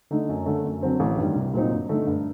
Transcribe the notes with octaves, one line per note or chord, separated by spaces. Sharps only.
D3 A3 D#4
F#2
D3 A3
F#2
D3 F#3 C4
A1
G2 D#3 G3
C2
A#2 F#3 C4 D#4
G2
D3 A3 D#4
G2